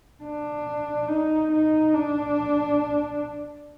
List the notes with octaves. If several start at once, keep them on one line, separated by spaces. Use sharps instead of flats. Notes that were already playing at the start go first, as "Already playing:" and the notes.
D4
D#4
D#4
D4